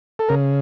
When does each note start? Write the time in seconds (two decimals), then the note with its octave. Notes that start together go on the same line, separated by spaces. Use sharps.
0.19 A4
0.29 C#3 A#4